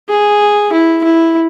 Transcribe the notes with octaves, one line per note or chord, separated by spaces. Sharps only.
G#4
E4
E4